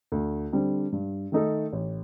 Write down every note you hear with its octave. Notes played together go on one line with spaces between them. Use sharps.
D2
D3 G3 C4
G2
D#3 A3 D#4 A4
A1